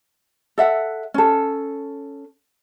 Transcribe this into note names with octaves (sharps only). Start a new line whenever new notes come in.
A4 E5 F#5
C#4 A4